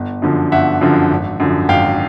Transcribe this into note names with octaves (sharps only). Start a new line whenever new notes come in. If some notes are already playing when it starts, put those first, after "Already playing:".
Already playing: G1
F#2 D3 F3
G1 E5 F#5
F#2 D3 F3
G#1
F#2 D3 F3
G#1 F5 G5